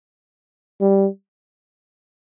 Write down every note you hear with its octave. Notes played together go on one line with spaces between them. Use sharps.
G3